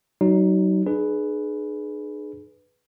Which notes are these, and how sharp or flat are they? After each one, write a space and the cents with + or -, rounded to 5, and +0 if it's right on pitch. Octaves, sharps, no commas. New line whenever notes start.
F#3 +30 D#4 +0
D4 +45 G#4 +20 B4 +0